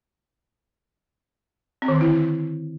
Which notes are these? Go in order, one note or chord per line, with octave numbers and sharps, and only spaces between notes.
C4
D#3
D3
E4